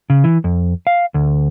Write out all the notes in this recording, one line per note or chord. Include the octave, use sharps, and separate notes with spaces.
C#3
E3
F2
F5
D2